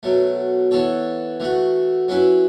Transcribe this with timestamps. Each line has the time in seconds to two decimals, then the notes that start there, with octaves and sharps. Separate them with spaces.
0.03 B2 F#3 A3
0.71 E3 B3 A4 C#5
1.40 E3 A3 F#4
2.08 F#3 C#4 E4 B4